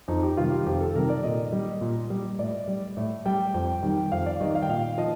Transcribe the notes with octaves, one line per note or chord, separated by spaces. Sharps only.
F2 D#4
G4
C3 D#3 G3 F4
G4
F2 G4
A4
C3 D#3 G3 A#4
D5
A#2 D#5
G3
A#2
G3
A2 D5
G3
A2
G3 G5
F2 G5
D#3 G3 G5
F2 F5
D5
D#3 G3 D#5
F5
G5
A#2 F5
F3 D#5